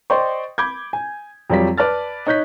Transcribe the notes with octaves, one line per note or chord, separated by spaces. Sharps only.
C5 D5 D#5 G5 C6 C#6
B5 D6 G6 G#6
G#5
F2 F#3 G3 F4 D5 B6
B4 D5 A5 F6 A6
D#4 C#5 F#6 G6 B6